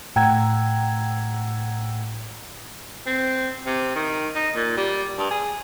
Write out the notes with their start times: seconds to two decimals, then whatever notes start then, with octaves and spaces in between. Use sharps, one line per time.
0.16 A2 F#5 G5 A#5 E6 G#6
3.06 C4
3.66 C3
3.95 D#3
4.35 D#4
4.55 A#2
4.77 G3
5.18 G2
5.31 G#4